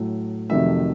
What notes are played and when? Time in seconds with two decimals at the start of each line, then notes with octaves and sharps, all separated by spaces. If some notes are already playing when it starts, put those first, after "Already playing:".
Already playing: A2 F#3 A3
0.49 F2 C3 D#3 F#3 A3 E5